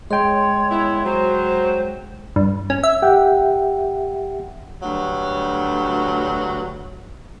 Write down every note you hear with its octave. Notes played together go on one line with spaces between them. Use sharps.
G#3 C#5 G5 C6
B3 E4
F#3 C5
G2
C#4
E5
G4 E5 F#5 G5
D2 G2 F#3